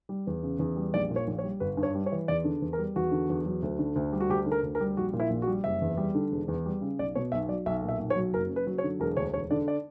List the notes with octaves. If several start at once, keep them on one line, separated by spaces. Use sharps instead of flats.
G3
E2
C#3
E2
G3
A#1 D5
A#2
C#5
A#1
C#5
G3
G1 B4
G2
C#5
G3
C#5
E3
E2 D5
D3
E2
A#4
G3
E2 F#4
D3
E2
F#3
D2
D3
D2
G3
F#4
D2 G4
D3
A#4
D2
A#4
G3
A#1 F#4
A#2
E4
A#1
F#4
G3
F#1 E5
E2
G3
D3
E1
E2
G3
C#3
B1 D5
B2 C#5
B1 E5
F#3 D5
B1 E5
A#2
E5
B1
C#5
F#3
F#1 A#4
F#2
B4
F#3
C#5
D3
E1 A#4
D2 C#5
E1 C#5
D3 D5
D5